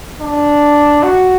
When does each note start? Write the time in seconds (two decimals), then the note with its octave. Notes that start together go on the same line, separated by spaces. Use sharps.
0.21 D4
1.03 F#4